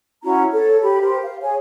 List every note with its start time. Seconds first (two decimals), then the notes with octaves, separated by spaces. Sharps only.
0.23 C#4 E4 F#4 A#5
0.52 A4 C#5
0.82 G4 B5
1.01 G4 A#4 C5
1.23 F5
1.42 G#4 C#5 G#5